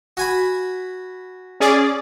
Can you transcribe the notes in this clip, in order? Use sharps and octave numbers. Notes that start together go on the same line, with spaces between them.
F#4 G#5 B5
C#4 G#4 D5